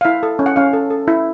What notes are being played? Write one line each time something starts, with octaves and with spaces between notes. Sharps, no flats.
F5
E4 E5
A4
C#4
F#5
C#4 F5
A4
A4
E4